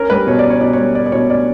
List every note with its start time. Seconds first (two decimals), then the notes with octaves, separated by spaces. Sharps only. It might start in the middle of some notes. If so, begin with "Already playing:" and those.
Already playing: C#4 A#4
0.10 G3 B4
0.27 B2 C#5
0.39 D5
0.45 C#4
0.50 C#5
0.61 B2 D5
0.73 C#5
0.78 G3
0.95 C#4 D5
1.06 D5
1.12 B2 C#5
1.30 C#4 D5